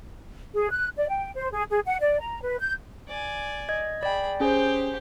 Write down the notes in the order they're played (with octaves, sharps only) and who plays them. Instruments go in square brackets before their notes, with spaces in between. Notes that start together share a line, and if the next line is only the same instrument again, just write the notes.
[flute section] G#4
F#6
D5
G5
C5
G#4
G#4
F#5
D5
A#5
B4
G6
[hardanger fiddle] D5 G#5
[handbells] D#5 G#6
[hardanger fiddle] G#4 B5 [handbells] D5 G5
[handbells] C#4 G#4 G#5 [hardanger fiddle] G4 C5